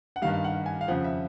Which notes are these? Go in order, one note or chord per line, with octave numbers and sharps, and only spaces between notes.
F#5
G2 D#3 G3 F5
F5
F#5
G#5
F5
F2 C#3 F3 F#5
E5